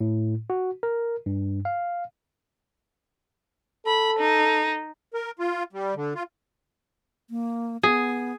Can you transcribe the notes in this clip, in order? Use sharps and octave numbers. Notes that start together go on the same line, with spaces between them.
A2
F#4
A#4
G2
F5
A4 B5
D#4
A#4
F4
G3
D3
F4
A#3
B3 G#4